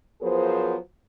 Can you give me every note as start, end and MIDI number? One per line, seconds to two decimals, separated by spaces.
0.21 0.76 53
0.21 0.76 54
0.21 0.76 59
0.21 0.76 68
0.21 0.76 70
0.21 0.76 72